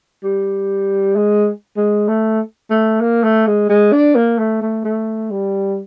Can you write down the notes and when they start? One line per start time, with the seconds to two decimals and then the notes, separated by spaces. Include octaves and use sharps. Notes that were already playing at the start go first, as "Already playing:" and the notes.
0.24 G3
1.16 G#3
1.77 G#3
2.08 A3
2.70 A3
3.01 A#3
3.24 A3
3.47 G#3
3.70 G#3
3.92 D4
4.16 A#3
4.39 A3
4.62 A3
4.85 A3
5.31 G3